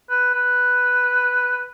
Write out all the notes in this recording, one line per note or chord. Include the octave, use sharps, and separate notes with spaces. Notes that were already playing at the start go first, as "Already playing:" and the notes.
B4
B4